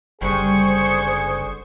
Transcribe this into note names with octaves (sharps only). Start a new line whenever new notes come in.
F#1 D3 G3 C4 G#4 C5 C#6